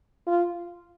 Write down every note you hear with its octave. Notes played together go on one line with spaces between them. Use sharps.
F4